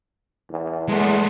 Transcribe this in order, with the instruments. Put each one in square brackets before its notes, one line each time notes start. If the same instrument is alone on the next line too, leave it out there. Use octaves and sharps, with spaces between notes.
[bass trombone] E2
[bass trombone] E2 [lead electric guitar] G#3 A3